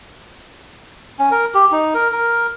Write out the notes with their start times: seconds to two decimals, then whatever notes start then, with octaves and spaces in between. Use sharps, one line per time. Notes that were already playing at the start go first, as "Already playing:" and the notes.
1.19 C#4
1.31 A#4
1.55 G4
1.72 D#4
1.94 A#4
2.12 A#4